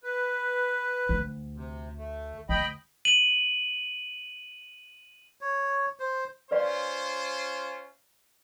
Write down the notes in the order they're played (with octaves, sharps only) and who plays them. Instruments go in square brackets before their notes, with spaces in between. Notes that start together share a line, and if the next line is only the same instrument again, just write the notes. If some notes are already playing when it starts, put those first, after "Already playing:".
[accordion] B4
[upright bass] D2
[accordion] C3
A3
[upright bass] D2 [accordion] D#5 G5 B5
[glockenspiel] D#7 F#7
[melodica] C#5
C5
[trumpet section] C#4 F4 C5 [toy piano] B4 D5 F5